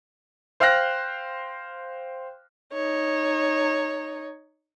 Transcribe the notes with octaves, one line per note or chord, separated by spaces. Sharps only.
C5 F5 G5 F6 F#6 A#6
D#4 C#5